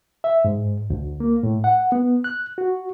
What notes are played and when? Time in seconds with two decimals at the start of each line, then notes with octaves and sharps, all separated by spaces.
0.24 E5
0.45 G#2
0.90 D2
1.20 A#3
1.43 A2
1.64 F#5
1.92 B3
2.24 F#6
2.58 F#4